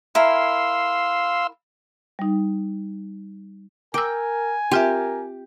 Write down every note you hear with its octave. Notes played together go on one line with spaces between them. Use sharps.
E4 A#4 F5 G#5 C6 E6
G3 D#4
A#4 G5 G#5 D6 E6
C4 F4 G4 A#4 E5